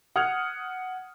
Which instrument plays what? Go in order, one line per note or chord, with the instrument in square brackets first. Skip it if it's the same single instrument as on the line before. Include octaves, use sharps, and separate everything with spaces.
[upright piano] F#5 D#6 F6 G#6 C#7 F7